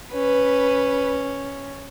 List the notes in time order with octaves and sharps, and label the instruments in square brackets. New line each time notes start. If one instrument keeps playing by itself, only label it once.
[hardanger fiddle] C#4 [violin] B4